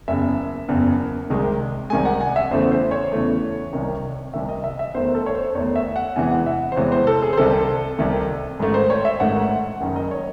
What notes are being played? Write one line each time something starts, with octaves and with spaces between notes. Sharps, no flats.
F#1 E2 C#3 E5
F#1 E2 C#3
C2 C3 D#3 G#3
C2 C3 D#3 G#3 G#5
F#5
G#5
E5
E2 C#3 E3 A3 C5
C5
C#5
E2 C#3 E3 A3
C2 C3 D#3
C2 C3 D#3 E5
D#5
E5
E5
E2 D#3 A3 C5
A4
C#5
C5
E2 D#3 A3 C#5
E5
F#5
E2 C3 E3 G#3 G#5
F#5
E5
C5
E2 C3 E3 G#3 C#5
C5
A4
G#4
C5
C2 C3 D#3 A4
C2 C3 D#3
A1 G#2 D#3 A3
C5
C#5
E5
A1 G#2 D#3 A3 F#5
F#1 F#2 D#3
D#5
C#5